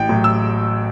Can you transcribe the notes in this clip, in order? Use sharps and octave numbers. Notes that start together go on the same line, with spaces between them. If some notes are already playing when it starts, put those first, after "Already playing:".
Already playing: A1 G5
A2 F#3
E6